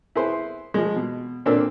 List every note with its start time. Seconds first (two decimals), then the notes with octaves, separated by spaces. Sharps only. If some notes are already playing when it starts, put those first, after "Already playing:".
0.16 E4 G#4 B4 C5 C6
0.74 F3 G#3
0.96 B2
1.46 A#2 D3 A#3 C4 D4 E6